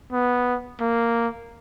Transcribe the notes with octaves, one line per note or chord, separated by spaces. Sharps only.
B3
A#3